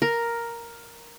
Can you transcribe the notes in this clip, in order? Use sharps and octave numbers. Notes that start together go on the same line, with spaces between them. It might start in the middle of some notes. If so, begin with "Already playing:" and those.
A#4